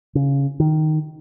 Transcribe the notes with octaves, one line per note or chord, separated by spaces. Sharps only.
C#3
D#3